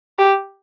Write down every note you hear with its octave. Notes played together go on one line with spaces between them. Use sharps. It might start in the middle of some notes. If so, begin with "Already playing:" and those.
G4